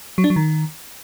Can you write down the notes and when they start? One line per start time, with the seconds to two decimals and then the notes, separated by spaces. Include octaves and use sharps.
0.18 F#3
0.24 D4
0.30 F#3
0.36 D#3